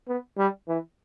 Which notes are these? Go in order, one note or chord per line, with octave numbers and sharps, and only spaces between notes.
B3
G3
E3